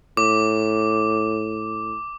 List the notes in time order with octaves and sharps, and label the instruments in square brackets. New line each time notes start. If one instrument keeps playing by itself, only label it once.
[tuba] A2 [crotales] D6